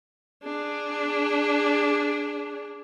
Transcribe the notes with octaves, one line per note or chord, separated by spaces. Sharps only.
D4 G#4